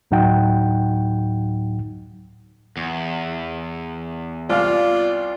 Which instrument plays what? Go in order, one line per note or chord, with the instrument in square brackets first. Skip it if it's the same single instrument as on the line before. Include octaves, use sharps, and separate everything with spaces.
[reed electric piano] D2 A2 F#3 D#4 F#5 G5
[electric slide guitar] E2
[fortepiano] C2 F5 [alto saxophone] F4 [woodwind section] D5